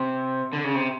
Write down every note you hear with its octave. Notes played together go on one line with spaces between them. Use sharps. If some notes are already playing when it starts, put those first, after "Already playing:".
Already playing: C3
D3
C#3
C3